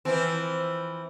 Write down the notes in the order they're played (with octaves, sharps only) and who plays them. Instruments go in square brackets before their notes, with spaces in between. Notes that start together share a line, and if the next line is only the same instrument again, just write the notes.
[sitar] E3 F3 C4